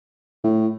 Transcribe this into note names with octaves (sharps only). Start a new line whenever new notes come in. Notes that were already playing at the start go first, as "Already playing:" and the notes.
A2